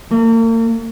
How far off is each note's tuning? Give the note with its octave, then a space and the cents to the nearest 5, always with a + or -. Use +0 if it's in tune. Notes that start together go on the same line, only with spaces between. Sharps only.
A#3 -40